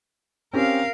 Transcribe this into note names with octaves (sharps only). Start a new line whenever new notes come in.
C4 C#4 G4 A#4 F5